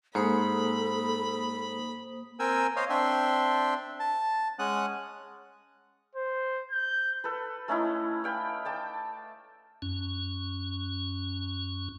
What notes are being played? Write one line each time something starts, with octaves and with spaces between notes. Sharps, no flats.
G#2 A#3 A4 C5 B5 D#6
C4 A#4 G5 G#5 E6
C5 C#5 D#5 F5
C4 D4 E5 G5 C6
A5
G#3 C#4 F#5 D#6 F#6
C5
G6
A4 B4
A3 C#4 D#4 E4
F5 G5 B5
G5 A5 D6
F#2 C#4